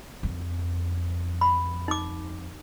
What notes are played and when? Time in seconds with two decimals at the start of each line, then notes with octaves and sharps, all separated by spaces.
0.23 F2
1.41 B5
1.88 D#4 D6